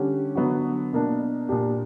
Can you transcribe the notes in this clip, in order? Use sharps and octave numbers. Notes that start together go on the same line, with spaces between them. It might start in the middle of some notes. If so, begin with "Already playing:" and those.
Already playing: D3 G3 C#4 G4
D3 F#3 B3 F#4
B2 A#3 D4
A#2 A#3 D4 G4